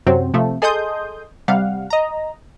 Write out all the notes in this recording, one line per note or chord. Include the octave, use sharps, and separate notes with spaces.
F#2 C3 F#3 C4
C3 F3 A3
G#4 A4 D#5 C6 D#6 G6
C3 G3 F5 F#5
D#5 A#5